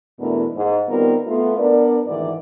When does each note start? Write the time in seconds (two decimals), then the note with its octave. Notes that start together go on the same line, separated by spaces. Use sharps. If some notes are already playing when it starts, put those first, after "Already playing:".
0.20 E2 B2 A3 D4 E4 A#4
0.56 G#2
0.88 D#3 G3 B3 C4 F4 A#4
1.27 A3 B3 F4
1.58 B3 D4 A#4 D5
2.06 D2 G#2 D#3 E3 D5